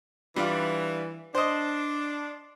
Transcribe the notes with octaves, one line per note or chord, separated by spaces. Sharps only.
E3 G3 D4 F4
D4 C5 D#5